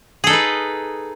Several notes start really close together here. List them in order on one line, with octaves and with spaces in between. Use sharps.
G#4 A4 D#4 B4